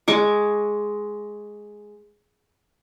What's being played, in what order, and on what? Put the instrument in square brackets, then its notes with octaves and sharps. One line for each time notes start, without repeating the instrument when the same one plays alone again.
[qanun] G#3 C#6 D6